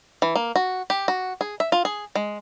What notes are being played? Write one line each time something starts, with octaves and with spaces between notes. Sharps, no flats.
E3
A#3
F#4
G4
F#4
G#4
E5
F4
G#4
G#3